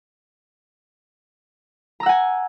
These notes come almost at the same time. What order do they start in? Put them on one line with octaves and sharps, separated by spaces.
A#5 E6 F#5 G#5